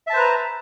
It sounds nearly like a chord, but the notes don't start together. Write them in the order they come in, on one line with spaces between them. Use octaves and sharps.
E5 A5 C5 B4 A#5